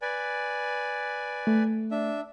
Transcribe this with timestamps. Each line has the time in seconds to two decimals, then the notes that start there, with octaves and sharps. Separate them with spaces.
0.02 B4 D5 G#5
1.47 A3
1.91 D4 E5